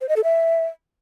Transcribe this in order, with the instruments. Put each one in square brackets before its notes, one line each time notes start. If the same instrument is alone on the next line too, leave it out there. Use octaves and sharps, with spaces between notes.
[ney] C5
D#5
A4
E5